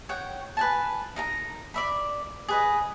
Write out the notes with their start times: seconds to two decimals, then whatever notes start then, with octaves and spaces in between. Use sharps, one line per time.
0.09 C#5 F#5 G5
0.57 B4 G#5 A5
1.16 D#4 A#4 A#5
1.74 D5 E5 B5
2.48 G#4 B4 D#5